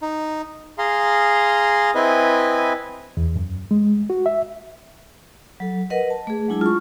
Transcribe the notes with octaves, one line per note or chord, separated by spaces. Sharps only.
D#4
G#4 F5 A#5 C6
C4 E4 B4 D#5 G#5
E2
F#2
G#3
F#4
E5
F#3 A4
A#4 B4 D#5 F#5
A5
A3 G#4
F#3 G#3 D4 E4 G#4 A5
F4 C#6